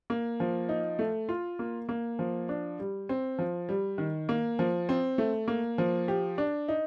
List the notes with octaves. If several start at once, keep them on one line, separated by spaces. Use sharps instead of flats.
A#3
F3
D#4
A3
F4
A#3
A#3
F3
D4
G3
C4
F3
G3
D#3
A#3
F3
C4
A3
A#3
F3
G4
D4
D#4